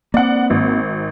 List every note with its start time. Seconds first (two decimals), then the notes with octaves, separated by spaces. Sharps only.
0.14 A#3 C4 D5 F#5
0.50 G#1